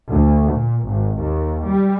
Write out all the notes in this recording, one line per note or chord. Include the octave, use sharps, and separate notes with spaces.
D2
A#2
G#1
D#2
G3